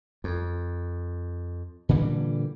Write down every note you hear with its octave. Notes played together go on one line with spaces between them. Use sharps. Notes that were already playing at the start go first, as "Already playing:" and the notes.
F2
A#2 D3 E3 G3